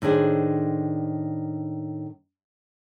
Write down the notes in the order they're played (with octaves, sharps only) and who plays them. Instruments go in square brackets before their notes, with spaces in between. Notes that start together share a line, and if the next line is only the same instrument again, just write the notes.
[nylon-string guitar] A2 D#3 D4 G#4 C5